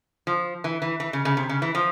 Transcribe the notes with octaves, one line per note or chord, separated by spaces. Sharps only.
F3
E3
E3
E3
C#3
C#3
C3
C#3
E3
F3